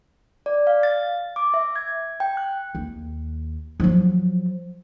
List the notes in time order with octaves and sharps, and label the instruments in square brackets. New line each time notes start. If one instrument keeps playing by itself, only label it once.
[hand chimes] D5
F5
A6
D6
E5
G#6
G5
F#6
[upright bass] D#2
F3 F#3